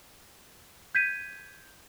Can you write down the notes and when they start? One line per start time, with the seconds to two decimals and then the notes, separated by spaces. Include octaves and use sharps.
0.95 G6 G#6 B6 D#7